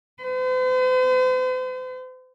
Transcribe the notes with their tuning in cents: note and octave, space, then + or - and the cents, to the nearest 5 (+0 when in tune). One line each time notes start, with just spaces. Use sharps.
C5 -45